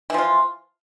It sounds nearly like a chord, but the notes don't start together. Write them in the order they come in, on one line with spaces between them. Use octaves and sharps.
E3 F3 F4